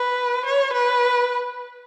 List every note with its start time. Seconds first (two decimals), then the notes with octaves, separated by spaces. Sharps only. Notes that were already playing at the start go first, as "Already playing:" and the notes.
Already playing: B4
0.45 C#5
0.73 B4